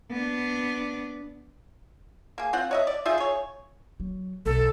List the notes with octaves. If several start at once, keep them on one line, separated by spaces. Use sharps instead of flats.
B3 D4
A#3 G#4
C4 F4 F#5
C#5 D#5 E5
D5
D#4 F4 G#4 E5
G#4 C#5
F#3
B1 A4